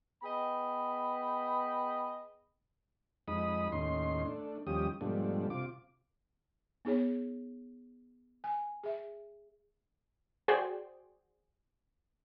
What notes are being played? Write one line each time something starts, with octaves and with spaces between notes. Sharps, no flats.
B3 G#4 D#5 G5 B5
F2 G#3 D#4 B5 D#6
D#2 A2 C#4 D#4 C6
A3 D4
D#2 F3 G3 C#4 G4 D#6
G#2 B2 F3 G3 A3 D4
C3 F4 D6
B3 D#4 G#4 C#5
G#5
G#4 E5
F#4 G#4 C5 D5 G5